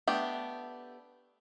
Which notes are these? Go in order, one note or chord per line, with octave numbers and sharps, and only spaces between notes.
A3 B3 D4 G4